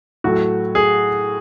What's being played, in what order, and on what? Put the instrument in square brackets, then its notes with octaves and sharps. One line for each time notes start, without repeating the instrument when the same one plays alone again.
[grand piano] A2 F#3 A3 F#4
G#4